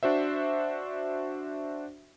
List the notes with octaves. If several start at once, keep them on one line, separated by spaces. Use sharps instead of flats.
D4 F#4 C5 E5